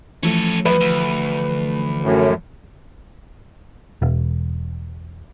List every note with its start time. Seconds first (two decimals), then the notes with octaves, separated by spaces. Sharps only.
0.23 E3 F3 A3 C#4 A4
0.65 F#2 B4
0.81 D2
2.03 F#2 A2
4.02 E1